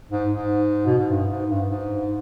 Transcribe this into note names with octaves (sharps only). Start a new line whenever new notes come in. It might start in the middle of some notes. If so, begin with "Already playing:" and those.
G#2
G#2
B2
G#2
G2
G#2
G2
G#2